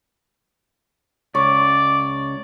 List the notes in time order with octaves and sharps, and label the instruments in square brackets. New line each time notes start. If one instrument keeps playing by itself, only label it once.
[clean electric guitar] C#2 [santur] C#5 [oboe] D5